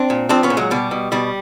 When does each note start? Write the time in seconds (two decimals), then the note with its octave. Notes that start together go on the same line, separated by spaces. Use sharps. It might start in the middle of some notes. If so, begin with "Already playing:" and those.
Already playing: C4 D4
0.10 A#2
0.29 F3 C4 D4
0.43 B3 C#4
0.50 A#2
0.57 F#3 G#3
0.71 B2 G3
0.91 B2
1.12 B2 G3